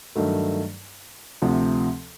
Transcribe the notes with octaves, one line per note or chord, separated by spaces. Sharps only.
G2 D#3 F#3 A3
D2 C3 F3